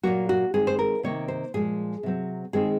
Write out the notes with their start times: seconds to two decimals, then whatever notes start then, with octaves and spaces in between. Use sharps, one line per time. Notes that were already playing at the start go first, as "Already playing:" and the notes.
0.03 A#2 F#3 A#3 F#4
0.29 F#4
0.54 D#3 G#3 C4 G#4
0.67 C5
0.79 A#4
1.03 C3 D#3 A#3 C#5
1.28 C5
1.54 A#2 F3 G#3 G#4
2.03 C3 F#3 C4
2.53 D#3 G#3 C4 G#4